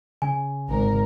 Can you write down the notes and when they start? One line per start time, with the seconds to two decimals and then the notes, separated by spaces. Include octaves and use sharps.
0.22 C#3 G#5
0.69 G#1 A#4